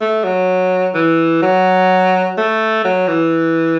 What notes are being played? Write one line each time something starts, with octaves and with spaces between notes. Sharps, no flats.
A3
F#3
E3
F#3
A3
F#3
E3